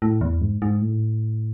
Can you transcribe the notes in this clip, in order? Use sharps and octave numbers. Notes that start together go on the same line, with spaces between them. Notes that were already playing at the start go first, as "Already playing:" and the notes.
A2
E2
G#2
G#2
A2